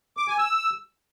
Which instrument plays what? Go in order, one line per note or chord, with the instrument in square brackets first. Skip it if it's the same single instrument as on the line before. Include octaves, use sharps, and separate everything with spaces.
[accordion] D6
G#5
E6